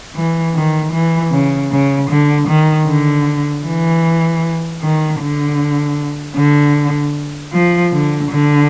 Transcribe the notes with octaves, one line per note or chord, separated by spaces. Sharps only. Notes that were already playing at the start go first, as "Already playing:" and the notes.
E3
D#3
E3
C#3
C#3
D3
D#3
D3
E3
D#3
D3
D3
F3
D3
D3